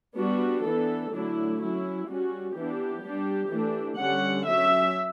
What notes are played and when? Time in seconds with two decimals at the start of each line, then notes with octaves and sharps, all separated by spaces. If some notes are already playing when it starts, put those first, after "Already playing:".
0.17 G3 B3 D4 F#4
0.65 E3 B3 D4 A4
1.13 D3 F#3 A3 D4 E4
1.60 F#3 C#4 E4
2.08 G3 C#4 F#4
2.56 E3 B3 D4 G4
3.04 G3 D4
3.51 E3 A3 D4
3.99 D3 G3 C#4 F#5
4.47 F#3 C#4 E5